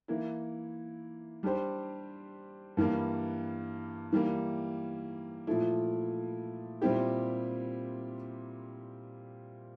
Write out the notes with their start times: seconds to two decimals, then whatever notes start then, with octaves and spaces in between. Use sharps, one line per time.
0.08 E3 A#3 E4
1.43 G3 D4 G4 C5
2.77 G2 E3 G3 A#3
4.13 E3 G3 A#3
5.47 A#2 F3 A3 E4
6.82 A#2 G3 C4 E4 G4